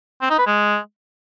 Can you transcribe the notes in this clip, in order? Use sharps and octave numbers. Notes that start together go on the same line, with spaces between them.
C4
D#4
B4
G#3